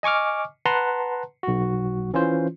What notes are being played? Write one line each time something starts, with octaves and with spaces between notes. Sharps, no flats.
D#5 G#5 C#6 D6 F6
B4 F#5 A5 A#5 C6
B1 F#4
E3 C#4 F4 C5